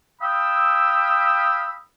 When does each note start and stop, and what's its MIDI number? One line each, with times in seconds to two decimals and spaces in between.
0.22 1.76 77
0.22 1.76 79
0.22 1.76 83
0.22 1.76 87
0.22 1.76 88